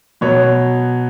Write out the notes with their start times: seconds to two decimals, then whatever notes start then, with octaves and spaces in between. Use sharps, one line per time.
0.21 B2 F#3 B3 C#5